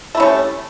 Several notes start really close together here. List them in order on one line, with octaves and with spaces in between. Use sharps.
A3 E4 C#4 G3